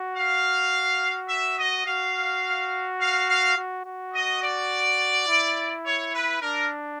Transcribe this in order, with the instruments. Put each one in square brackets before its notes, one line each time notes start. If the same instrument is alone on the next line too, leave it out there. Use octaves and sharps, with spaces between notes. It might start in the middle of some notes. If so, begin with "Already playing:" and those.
Already playing: [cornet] F#4
[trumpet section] F5
E5
D#5
[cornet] F#4 [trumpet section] F5
[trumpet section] F5
F5
[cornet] F#4
F#4
[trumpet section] D#5
D5
[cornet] E4
[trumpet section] C#5
B4
[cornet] D4 [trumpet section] A#4